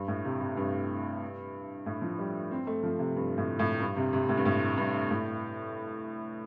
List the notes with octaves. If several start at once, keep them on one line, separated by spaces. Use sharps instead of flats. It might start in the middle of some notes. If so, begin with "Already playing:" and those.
Already playing: G2
A2
C3
C3
G2
A2
F3
G3
C4
A3
F3
C3
G2
A2
A2
G2
C3
C3
A2
G2
A2
G2
A2